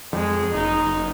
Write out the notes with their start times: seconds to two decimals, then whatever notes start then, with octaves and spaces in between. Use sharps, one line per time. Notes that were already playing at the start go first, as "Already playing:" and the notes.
0.13 F2 G#3
0.54 F#1 D#4